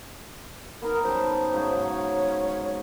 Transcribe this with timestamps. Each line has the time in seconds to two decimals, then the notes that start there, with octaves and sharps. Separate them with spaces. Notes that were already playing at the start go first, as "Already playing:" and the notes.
0.82 B3 D#4 A#4
1.03 F#2 G3 C5 A5
1.53 G#2 C#3 F#3
1.77 C#5